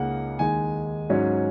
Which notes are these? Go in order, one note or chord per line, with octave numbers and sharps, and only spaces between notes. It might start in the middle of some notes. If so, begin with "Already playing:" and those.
Already playing: C#2 C#3 A#3 D#4 F#5
D#2 D#3 G#3 D#4 G#5
G#2 F#3 C#4